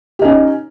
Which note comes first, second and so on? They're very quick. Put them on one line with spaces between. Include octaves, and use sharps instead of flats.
G4 D#4 C#4